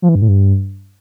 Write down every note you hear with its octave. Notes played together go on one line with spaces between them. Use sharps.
F3
E3
G2
A2
G2